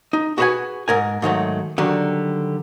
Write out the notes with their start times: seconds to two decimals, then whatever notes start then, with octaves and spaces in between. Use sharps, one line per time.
0.13 D#4
0.38 F#4 G#4 B4 E5 F#5 G#5
0.88 G#2 A#4 G#5
1.22 G#2 D#3 F#3 A3
1.78 D3 D#3 F#3 G3